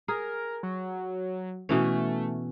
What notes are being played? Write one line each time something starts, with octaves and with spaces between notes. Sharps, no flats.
G#4 A#4
F#3
B2 E3 A3 C#4